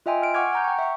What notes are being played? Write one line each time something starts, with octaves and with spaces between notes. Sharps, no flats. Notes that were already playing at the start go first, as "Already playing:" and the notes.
F4 D#5 E5 G5 G#5 C6
F6 D7
F#5 G#5 C#6 D6 F6 G#6
F#5 A#5 G6
G5 C#6
E5 C#6